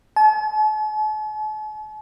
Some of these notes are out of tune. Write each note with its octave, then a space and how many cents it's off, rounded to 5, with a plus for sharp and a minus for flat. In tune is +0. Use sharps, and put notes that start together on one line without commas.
A5 -45